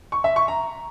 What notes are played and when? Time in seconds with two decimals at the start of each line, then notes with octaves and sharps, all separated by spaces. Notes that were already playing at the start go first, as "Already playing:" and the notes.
0.12 C#6
0.24 E5
0.36 C#6
0.48 A#5